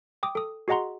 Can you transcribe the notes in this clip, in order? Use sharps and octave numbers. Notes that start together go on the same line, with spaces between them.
G5 D6 D#6
A4 D#6
F#4 G#4 D#5 F#5 A#5 C6